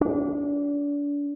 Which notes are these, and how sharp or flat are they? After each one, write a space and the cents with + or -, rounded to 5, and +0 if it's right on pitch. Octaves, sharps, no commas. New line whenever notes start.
D4 -35